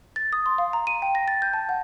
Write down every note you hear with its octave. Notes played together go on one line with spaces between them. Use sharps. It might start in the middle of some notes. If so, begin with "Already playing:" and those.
A6
D#6
C6
F5
A#5
D#7
G5
A#6
A6
G6
A5
F#5